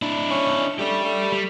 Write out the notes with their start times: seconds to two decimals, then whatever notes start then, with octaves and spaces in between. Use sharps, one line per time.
0.02 D4 E4
0.30 C#4
0.79 A3 G4 D5
1.04 A3
1.32 G3